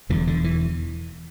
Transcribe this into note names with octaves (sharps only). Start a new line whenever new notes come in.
E1 E2 D3 E3
D3
E3